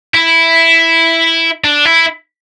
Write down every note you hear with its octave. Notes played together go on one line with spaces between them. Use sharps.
E4
D4
E4